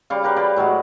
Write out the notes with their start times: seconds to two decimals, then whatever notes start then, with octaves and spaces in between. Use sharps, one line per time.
0.10 C#3 G3 F5 D6
0.24 G4 A#4 B4
0.36 G4 B4 D5 F5
0.56 A2 F#3 G#3 F#4